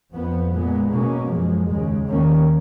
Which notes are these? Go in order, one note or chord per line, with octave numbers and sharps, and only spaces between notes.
F2 F3 B3
A#2 G#3 B3
B2 A#3 C#4
F#2 F3 G#3
D#2 C#3 G#3
D#2 D#3 A#3 C#4